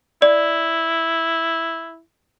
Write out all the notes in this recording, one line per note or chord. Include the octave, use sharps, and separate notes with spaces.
E4 D5